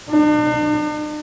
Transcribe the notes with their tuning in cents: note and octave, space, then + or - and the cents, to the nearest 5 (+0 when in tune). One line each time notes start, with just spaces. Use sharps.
D4 +45